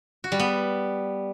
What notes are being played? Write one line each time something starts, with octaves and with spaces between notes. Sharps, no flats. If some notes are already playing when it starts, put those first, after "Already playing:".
F#4
G3
B3